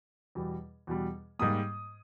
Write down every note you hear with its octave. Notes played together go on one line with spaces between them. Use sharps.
E2 B2 G3
E2 B2 G3
G#2 G3 A#3 D#6